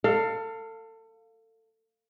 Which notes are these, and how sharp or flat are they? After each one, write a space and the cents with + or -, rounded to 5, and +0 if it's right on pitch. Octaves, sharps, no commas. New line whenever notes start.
A4 +30 F5 +0